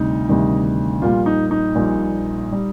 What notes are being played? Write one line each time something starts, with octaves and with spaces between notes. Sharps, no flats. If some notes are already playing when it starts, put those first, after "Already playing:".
Already playing: D2 C3 G3 D#4
D2 C3 D#3 G3
A#1 A#2 G3 F4
D#4
D#4
A#1 A#2 G3
G3